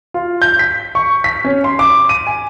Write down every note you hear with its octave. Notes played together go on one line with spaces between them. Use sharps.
F4
G6
B6
C#6
B6
C#4
C6
D6
D#7
G#5